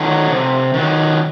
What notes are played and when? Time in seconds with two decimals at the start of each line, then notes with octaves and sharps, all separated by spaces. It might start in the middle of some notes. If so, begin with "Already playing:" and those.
Already playing: D#3 F#3 A4
0.30 C3
0.74 D#3 F#3